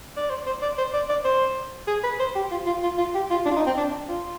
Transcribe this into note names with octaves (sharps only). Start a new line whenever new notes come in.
D5
C5
C5
D5
C5
D5
D5
C5
G#4
B4
C5
G4
F4
F4
F4
F4
G4
F4
D4
F4
D#4
C4
D4
F4